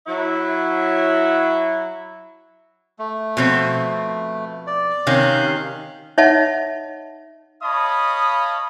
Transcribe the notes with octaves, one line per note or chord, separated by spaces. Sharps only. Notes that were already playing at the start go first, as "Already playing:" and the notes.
F#3 E4
A3
B2 F3 C4
D5
C3 D#3 C#4 F5 F#6 G6
D#4 C#5 D#5 E5 F#5 A5
C#5 D#5 F5 A5 B5 D#6